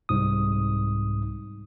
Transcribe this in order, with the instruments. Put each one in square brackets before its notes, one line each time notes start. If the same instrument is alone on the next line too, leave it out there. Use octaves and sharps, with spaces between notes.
[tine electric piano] C2 G#2 D#6